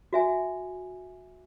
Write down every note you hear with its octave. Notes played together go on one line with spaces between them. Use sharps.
F#4 E5 G#5